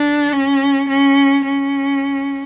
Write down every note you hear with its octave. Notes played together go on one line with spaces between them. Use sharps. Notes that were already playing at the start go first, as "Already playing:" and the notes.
Already playing: D4
C#4
C#4
C#4